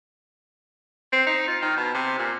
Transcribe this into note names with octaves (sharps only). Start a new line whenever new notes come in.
C4
D#4
F4
D#3
B2
C3
A#2